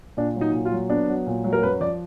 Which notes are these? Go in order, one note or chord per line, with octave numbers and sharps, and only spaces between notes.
A#2 D4
F#3
D#4
A#2
F4
F#3
B3 D4
F#3
A#2
F#3
A#4
F#2 B4
F3 D5